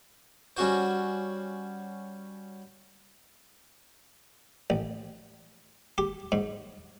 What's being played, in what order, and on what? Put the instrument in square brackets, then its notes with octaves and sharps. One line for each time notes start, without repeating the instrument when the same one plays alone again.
[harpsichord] G3 C#4 F#4 C5
A1
G4
G#2